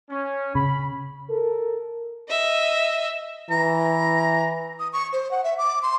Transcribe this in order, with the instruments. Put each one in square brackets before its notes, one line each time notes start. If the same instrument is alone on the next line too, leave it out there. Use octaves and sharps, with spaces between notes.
[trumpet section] C#4
[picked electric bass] C#3 [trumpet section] B5
[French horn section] A4 A#4
[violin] D#5 E5
[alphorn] E3 [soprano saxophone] A#5
[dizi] D#6
C#6
C5
F#5
E5
D6
C6